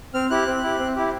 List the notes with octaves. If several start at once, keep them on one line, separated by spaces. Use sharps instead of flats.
C4 F6
E4 G4 F#6
C4
E4 G4
C4
E4 G4